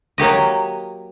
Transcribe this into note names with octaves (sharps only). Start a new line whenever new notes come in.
F#3 A#3 G4 D#5